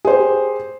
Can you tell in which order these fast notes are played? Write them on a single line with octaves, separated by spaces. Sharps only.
G#4 C5 G4